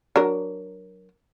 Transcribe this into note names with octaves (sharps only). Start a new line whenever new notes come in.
F#3 D4 A#4